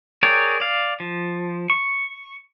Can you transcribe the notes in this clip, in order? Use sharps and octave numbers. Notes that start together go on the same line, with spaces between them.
G#4 A#4 C#5 D5 G5
D5 F5
F3
C#6